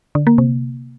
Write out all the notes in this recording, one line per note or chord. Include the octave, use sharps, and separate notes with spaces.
D3
A#3
C3